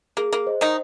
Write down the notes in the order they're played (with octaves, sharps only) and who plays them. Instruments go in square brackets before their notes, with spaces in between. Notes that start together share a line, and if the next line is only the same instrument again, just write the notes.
[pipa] A#3 [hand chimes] G#4
[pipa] A#3
[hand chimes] C5 D#5
[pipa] D#3 D#4